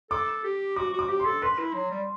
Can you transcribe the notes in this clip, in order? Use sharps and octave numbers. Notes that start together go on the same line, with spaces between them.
A4 D6
G4
F#4 D6
F#4
D6
G4
C6
A4
B4 C6
E4
F#3
G3